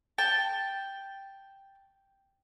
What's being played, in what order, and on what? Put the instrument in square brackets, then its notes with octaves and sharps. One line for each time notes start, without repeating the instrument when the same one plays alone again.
[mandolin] G5 A5